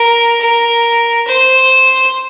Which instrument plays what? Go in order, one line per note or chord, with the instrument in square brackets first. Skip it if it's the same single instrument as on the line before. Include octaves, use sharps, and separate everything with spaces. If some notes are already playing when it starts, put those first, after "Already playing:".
Already playing: [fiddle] A#4
A#4
C5